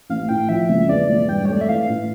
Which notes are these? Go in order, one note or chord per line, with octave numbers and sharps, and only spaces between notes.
A1 F5
A2 G5
F3 E5
C#2
E2 D5
E1
G2 G5
C#5
A3 D5
E5
E3 F5
A2